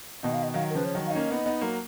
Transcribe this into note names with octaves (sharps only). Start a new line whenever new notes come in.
B2 D#3 D#5
F5
D#5
D#3 F#3 F5
A#4
C#3 F3 B4
C#5
D#3 F#3
F5
D#4
A#3 C#4 D#5
B3 D#4
B3 D#4
F#3 A#3